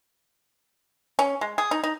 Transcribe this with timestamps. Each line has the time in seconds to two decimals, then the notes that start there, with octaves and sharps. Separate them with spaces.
1.19 C#4
1.41 G#3
1.58 G#4
1.71 D#4
1.84 D#4